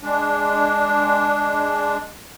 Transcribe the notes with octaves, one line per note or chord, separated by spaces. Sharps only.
G#3 D4